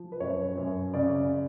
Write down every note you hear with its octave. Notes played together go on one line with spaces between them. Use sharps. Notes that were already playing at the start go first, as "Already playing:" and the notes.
Already playing: F3
B4
F#2 C#5
F#2
C#3 D5